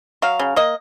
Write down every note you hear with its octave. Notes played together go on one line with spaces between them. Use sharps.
F#3 F5
C#3
A#3 D#5